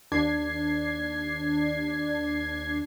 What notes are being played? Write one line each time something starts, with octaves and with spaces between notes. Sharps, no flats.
D#2 D4 G#6 C7